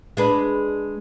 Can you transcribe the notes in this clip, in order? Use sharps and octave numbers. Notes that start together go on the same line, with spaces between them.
G#3 D4 B4